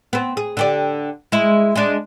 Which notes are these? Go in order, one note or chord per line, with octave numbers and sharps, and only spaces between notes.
B3 C4
G#4
D3 G4 D5
G#3 E4
G#3 D4